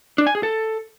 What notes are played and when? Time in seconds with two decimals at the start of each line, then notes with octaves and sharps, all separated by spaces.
0.18 D4
0.27 G#5
0.35 G#4
0.43 A4